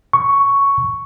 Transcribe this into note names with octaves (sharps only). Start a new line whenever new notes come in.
C#6